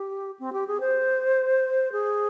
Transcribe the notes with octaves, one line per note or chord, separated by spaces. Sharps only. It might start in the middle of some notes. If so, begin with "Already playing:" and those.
Already playing: G4
C4
G4
G#4
C5
G#4